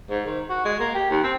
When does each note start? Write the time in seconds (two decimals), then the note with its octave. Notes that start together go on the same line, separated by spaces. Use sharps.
0.10 G#2
0.26 D#3
0.49 F#4
0.65 G#3
0.80 A#3
0.94 G4
1.10 D#2
1.23 C4